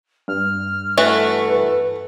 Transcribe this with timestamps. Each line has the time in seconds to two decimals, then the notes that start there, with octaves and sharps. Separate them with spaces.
0.28 G2 F6
0.97 E3 A3 F#4 A4
1.49 B4